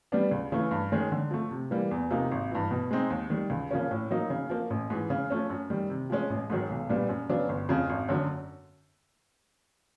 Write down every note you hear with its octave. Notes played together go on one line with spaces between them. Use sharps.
G3 B3 D4
C#2
C#3 E3 A3
G2
D#3 G#3 C#4
D3
F3 A3
C3
E3 G3 A#3
E2
C3 F3 A#3 D#4
G#1
G2 E3
B2
G#3 C4 D#4
D#2
D#3 G3
C#2
C#3 F3 A#3 C#4
A2
F#3 A#3 D#4
C#3
F3 A#3
A1
G#2 E3
C#3
F3 A3 C#4
F#2
D#3 G3
C3
F3 G#3 C#4
A1
G#2 D#3 F#3
B1
A#2 G3 B3 D4
F#2
C#3 F#3 B3 D4
G1
F2 C#3 F3
G#1
F#2 D3 F#3